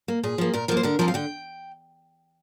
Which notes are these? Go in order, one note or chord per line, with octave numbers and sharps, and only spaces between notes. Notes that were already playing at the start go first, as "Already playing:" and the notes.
A#3
A#2 G#4
F3 A#3
A#2 A#4
F3 A#3 A#4
C5
D3 A#4
F3 C4 A#4
F5
D3 G5